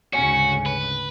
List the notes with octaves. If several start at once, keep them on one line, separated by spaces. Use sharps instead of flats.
D2 G#2 C#3 F#4 C#5 G#5
B4